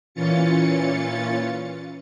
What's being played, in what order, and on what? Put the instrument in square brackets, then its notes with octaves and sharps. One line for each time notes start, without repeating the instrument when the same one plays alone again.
[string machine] A#2 E3 C#4 F4 A6 C#7